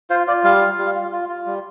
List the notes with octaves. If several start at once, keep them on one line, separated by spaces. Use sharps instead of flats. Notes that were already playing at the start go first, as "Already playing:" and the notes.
F4 C5
F4 D5
G3 F5
F4
G3
F4
F4
F4
G3